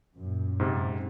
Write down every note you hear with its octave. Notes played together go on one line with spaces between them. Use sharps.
F#2 A#2
G#2 C3